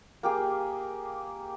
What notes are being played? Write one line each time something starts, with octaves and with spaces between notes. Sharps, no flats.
A#3 G4 G#4